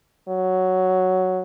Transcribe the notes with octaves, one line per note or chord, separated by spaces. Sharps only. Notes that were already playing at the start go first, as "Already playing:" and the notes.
F#3